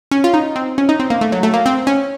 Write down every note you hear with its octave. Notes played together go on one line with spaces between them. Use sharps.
C#4
F4
D#4
C4
C#4
D#4
C4
A#3
A3
F#3
A3
A#3
C4
C#4